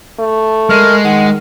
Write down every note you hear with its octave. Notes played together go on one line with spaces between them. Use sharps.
A3
G#3 A#4 F6
D#3 F#5